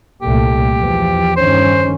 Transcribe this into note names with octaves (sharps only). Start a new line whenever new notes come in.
C2 A#2 A3 G4
E2 F3
G2 D#3 C#4 C5